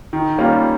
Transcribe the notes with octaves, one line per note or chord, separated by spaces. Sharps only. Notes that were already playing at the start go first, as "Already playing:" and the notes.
D#3
G3 A#3 C#4 F4